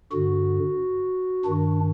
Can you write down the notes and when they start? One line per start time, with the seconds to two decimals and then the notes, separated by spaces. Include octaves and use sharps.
0.12 G2 D3 F#4
1.45 G2 D#3 D4